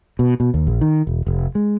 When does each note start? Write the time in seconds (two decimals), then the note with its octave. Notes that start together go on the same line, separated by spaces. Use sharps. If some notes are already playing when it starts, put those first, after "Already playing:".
0.19 B2
0.40 B2
0.54 D#2
0.67 A#1
0.81 D#3
1.07 E1
1.27 F1
1.55 G#3